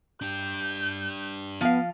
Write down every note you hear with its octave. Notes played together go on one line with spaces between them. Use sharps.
D4 G4 G6
F3 B3 F5